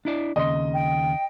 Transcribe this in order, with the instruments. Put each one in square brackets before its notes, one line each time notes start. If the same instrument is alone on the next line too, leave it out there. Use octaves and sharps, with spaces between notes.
[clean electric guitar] D4 E4 D5
[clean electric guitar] D#2 C#3 C6 [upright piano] D#5
[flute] G5